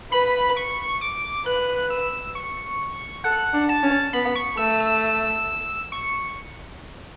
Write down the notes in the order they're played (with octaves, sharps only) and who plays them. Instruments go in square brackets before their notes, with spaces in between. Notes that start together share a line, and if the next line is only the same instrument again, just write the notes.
[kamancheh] B4 [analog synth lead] B5
[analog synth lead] C#6
D6
[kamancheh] B4 [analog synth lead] F#6
[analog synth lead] E6
C#6
[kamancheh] A4 [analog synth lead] F#5
[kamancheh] D4
[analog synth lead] A5
[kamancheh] C#4
[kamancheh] B3 [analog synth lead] B5
[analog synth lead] C#6
[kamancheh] A3 [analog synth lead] E6
[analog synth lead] E6
C#6